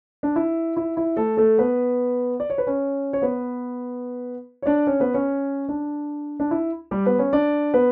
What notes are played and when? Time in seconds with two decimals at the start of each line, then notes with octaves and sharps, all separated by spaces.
0.23 D4
0.36 E4
0.77 E4
0.97 E4
1.17 A3 A4
1.37 A3 A4
1.58 B3 B4
2.40 D5
2.50 C#5
2.58 B4
2.67 C#4 C#5
3.13 C#5
3.22 B3 B4
4.62 C#5
4.66 D4 D5
4.87 C#4 C#5
5.00 B3 B4
5.14 C#4 C#5
5.69 D4
6.40 D4
6.51 E4
6.91 G3 G4
7.06 B3 B4
7.19 C#4 C#5
7.33 D4 D5
7.74 B3 B4